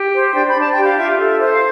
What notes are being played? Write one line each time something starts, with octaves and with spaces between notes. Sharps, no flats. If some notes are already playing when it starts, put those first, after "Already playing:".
Already playing: G4
C5
D4 G5
B5
D4
A5
G4 G5
F5
F4 E5
A4
E5
C5
F5